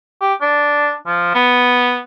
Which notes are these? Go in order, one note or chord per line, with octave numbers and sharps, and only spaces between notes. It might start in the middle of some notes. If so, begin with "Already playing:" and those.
G4
D4
F3
B3